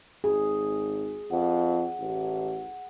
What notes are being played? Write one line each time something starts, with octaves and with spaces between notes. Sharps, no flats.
G#1 G#4
F2 F#5
A1